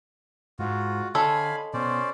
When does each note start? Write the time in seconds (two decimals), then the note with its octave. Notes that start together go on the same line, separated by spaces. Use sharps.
0.59 G#2 F4 F#4
1.15 D3 G#3 A4 C#5 F5 G#5 B5
1.74 B2 C#4 C5 D5